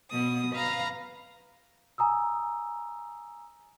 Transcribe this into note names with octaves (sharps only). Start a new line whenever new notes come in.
B2 B3 D#6
B4 F5 A#5
G#5 A#5 D#6 E6